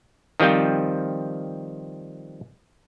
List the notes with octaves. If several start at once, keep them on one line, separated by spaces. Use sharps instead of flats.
D#3 F3 G3 C4 F4